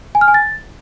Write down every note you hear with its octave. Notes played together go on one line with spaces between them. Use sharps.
G#5
F6
G#5
A6